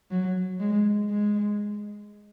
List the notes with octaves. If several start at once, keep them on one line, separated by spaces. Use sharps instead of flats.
F#3
G#3
G#3